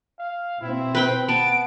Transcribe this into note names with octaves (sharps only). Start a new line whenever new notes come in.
F5
B2 C4 E4
B4 G5 B5
B3 A5 D7